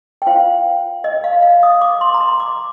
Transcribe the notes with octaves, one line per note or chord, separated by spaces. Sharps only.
G5
F4 C5 F5
D#5
F5
F5
D#6
D6
C6
A#5
C6
D6